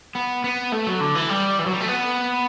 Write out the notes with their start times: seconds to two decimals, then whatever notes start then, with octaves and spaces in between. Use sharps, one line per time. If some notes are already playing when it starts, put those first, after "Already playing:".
0.16 B3
0.44 B3
0.72 A3
0.87 F#3
1.01 D3
1.15 E3
1.30 G3
1.59 E3
1.66 F#3
1.73 G3
1.81 A3
1.88 B3